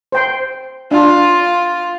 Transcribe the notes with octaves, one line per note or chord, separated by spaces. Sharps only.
C5 G5 C6
D4 F4